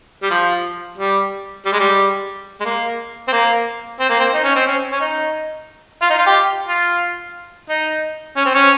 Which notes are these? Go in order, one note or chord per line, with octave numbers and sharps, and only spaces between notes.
G3
F3
G3
G3
G#3
G3
G#3
A#3
C4
A#3
C4
A#3
C4
D#4
C#4
C4
C#4
C#4
D#4
F4
D#4
F4
G4
F4
D#4
C#4
C4
C#4